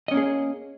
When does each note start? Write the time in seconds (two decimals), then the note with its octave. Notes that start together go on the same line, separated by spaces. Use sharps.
0.08 D#5
0.11 C#4
0.14 A#3
0.17 G#4